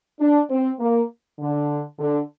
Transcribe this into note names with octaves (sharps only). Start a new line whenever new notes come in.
D4
C4
A#3
D3
D3